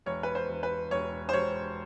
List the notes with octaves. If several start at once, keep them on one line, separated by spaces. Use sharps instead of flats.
E1 C#5
B4
C5
E1
B4
E1 C#5
C5
E1 C#5